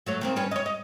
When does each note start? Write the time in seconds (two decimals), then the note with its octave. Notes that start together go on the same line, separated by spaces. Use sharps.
0.06 F#3 A3 C#5
0.21 D#3 A#3 C4
0.36 G3 C#4 B4
0.51 C#5 D#5
0.66 D#5